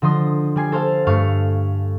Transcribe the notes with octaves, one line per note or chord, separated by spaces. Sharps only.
D3 F3 D#5 C6 D#6
G3 G#5 C7
A4 C5 F5 A5
G2 A3 F5 C#6